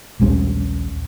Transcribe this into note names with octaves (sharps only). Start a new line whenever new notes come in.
A#1 D#2 G3 C#4